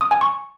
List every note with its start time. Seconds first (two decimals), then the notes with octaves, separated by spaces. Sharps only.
0.01 D#6
0.11 G#5
0.21 C#6